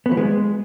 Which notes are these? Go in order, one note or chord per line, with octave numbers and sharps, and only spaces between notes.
B3
F3
G#3